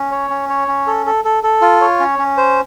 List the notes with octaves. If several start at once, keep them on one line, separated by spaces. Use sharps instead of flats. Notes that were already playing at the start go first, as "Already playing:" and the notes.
Already playing: C#4
C#5
C#4
C#5
C#4
A4
A4
A4
A4
F4
C#5
C#4
C#4
C5